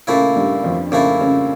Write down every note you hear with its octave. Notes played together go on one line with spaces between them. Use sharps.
A#2 C#3 A3 C#4 E4
G2 G3
F2 F3
A#2 C#3 A3 C#4 E4
C#3 C#4